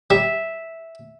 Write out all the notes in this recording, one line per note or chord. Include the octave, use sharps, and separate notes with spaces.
G3 E5